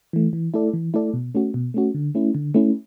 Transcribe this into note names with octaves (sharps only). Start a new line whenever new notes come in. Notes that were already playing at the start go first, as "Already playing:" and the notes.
E3 A3
E3
A3 E4 A4 D5
E3
A3 E4 A4 D5
B2
A3 C#4 F#4
B2
A3 C#4 F#4
D3
A3 C#4 E4
D3
A3 C#4 E4